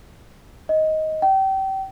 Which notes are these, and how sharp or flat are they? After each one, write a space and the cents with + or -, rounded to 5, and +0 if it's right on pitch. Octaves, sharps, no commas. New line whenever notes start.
D#5 +10
G5 -30